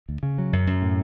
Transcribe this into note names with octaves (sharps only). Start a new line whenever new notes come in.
D2
C#3
F#3
F#2
F#2
A2